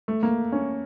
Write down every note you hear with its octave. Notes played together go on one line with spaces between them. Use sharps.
A3
A#3
C#4